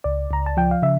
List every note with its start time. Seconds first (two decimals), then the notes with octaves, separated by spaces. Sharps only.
0.04 C#2 D5
0.31 C#2 A#5
0.46 A5
0.57 F3 G5
0.71 F5
0.82 C#3 E5